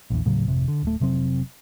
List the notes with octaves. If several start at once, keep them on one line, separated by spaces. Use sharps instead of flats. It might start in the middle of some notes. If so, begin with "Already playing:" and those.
A#1 E2
D#1 A2 C#3 F#3
G#1 F2 C3
D3
D1 A3
F1 C3 F#3 C4